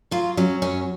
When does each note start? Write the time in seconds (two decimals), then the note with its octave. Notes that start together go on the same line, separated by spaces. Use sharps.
0.11 F#3 F4
0.37 F#3 C#4
0.62 F#2 C#4